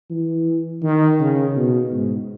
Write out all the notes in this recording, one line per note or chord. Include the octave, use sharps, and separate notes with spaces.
E3
D#3
C#3
B2
G#2